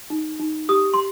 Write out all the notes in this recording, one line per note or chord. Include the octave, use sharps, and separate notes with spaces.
D#4
D#4
G4 D#6
C6